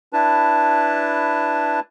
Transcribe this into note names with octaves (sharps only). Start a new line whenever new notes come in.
D4 E4 B4 A5